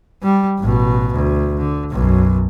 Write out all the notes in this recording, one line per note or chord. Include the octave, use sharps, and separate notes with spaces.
G3
A1 B2
D2
D3
B1 F#2